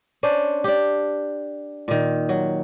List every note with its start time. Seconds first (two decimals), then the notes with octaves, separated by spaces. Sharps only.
0.23 C#4 D4 C5
0.64 D4 G4
1.88 A#2 D#3
2.29 F#3